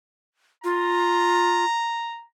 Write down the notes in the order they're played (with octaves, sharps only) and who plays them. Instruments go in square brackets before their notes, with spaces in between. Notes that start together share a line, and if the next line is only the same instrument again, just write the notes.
[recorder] F4 [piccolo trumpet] A#5